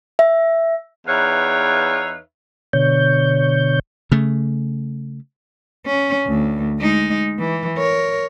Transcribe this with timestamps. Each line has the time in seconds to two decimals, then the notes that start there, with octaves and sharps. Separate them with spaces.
0.19 E5
1.07 E2 D#4 B4 C#5 E5 F5
2.73 B2 D3 C#5 G6
4.12 C#3 A3
5.86 C#4
6.27 D2
6.79 G#3 D#4
7.39 E3
7.77 A#4 C#5